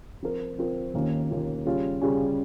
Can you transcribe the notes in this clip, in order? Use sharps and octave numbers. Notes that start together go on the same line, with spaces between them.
F3 C4 F4 A#4
F3 C4 F4 A#4
D#2 D#3 A#3 C#4 F4
D#2 D#3 A#3 C#4 F4
C#3 G3 C#4 F4
C#3 G3 C#4 F4